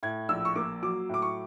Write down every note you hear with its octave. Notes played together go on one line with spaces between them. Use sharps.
A2 G#6
A#1 E6
C#6
A#3 D6
F#3 D6
A2 D6
C#6